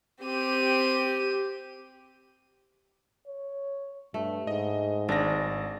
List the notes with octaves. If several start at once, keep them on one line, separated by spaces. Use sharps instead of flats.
C4 G4 D#7
C#5
G2 A3
G#2 D#5
G#1 D4 A#6